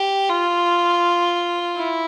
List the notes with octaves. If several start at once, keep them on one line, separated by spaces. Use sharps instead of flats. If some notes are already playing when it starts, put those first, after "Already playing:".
Already playing: G4
F4
E4